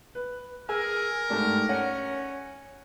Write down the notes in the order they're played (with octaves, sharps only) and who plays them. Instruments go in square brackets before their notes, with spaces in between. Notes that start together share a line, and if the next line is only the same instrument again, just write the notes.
[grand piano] B4
[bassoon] G#4 [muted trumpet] A#4 [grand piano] E6
[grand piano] G#2 A3 [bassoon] G3
[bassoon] C#4 [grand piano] F#5